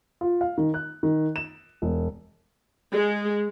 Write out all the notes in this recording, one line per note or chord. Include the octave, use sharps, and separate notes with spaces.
F4
F5
D#3
F#6
D#3
E7
E1
G#3